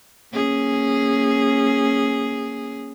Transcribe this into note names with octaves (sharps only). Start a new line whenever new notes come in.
A#3 C#4 G#4